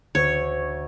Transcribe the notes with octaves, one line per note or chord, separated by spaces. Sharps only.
D2 C#5